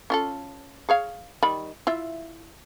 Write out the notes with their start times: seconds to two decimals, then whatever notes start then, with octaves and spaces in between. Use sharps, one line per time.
0.10 C#4 F4 A4
0.89 G#4 C#5 F5
1.43 D#3 G3 B5
1.87 E4 F4 E5